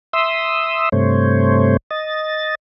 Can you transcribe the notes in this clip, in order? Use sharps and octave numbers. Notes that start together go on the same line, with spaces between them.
E5 C6 D#6 E6
G2 C3 A3 C5 C#5
D#5 A6